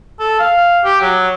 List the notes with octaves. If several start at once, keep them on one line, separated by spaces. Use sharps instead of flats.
A4
F5
G4
F#3